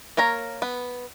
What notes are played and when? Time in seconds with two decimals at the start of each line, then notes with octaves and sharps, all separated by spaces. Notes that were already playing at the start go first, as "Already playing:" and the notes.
0.17 A#3 A#4 C#5 A#5
0.62 B3